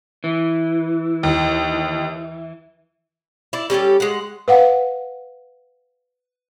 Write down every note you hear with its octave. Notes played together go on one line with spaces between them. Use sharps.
E3
D#2
E4 D5
G3 C#4 G4 A4
G#3 F#5
B4 F5 F#5